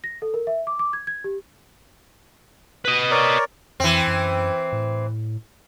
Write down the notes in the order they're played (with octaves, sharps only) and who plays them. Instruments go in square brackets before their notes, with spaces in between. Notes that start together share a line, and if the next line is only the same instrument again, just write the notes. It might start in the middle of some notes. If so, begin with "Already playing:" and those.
[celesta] A#6
A4
A#4
E5
D6
D6
G#6
G#6
G4
[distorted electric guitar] B4 D#5
[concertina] A#4 C#5 D5
[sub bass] F2 [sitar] E3 C4
[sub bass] F#2
A2